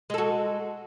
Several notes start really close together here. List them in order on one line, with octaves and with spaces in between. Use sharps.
G#3 A4 F#4